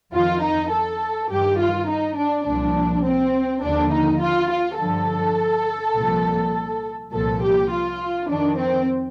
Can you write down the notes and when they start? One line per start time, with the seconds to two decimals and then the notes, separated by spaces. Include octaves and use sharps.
0.13 F2 D#3 F4
0.42 D#4
0.71 A4
1.30 G2 D#3 G4
1.59 F4
1.88 D#4
2.17 D4
2.46 C2 A#2 F3 D4
3.05 C4
3.63 D#2 D3 F3 D4
3.92 D#4
4.22 F4
4.50 F4
4.79 G2 D3 F3 A4
5.96 C2 A#2 F3
7.12 C2 A#2 F3 A4
7.41 G4
7.71 F4
8.29 F2 D#3 D4
8.58 C4